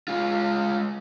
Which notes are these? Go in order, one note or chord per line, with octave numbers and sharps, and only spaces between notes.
G#3 F4